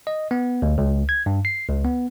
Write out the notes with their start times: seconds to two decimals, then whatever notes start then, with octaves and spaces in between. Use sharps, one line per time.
0.07 D#5
0.31 B3
0.62 D2
0.78 C#2
1.09 G#6
1.26 G2
1.45 C7
1.69 C#2
1.85 B3